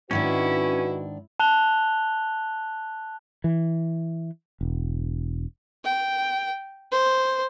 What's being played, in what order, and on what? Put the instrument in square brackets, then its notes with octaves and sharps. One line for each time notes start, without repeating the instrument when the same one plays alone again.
[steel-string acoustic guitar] G#2 D#3 D4 [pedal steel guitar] C#4 [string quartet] E4 [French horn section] F#4 B4
[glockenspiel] A5 F#6 F7 G7
[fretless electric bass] E3
E1
[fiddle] G5
C5